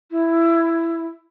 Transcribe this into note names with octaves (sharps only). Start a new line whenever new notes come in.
E4